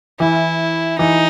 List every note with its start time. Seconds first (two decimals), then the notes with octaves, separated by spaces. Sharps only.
0.20 E3 E4
0.99 E3 D#4